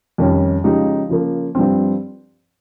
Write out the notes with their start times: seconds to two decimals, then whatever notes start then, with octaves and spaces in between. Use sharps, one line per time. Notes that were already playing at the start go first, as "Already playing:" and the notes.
0.18 F2 D#3 G3 C#4
0.64 C#3 F3 G#3 D#4 G4
1.09 C#3 F3 A#3
1.55 G2 F3 C4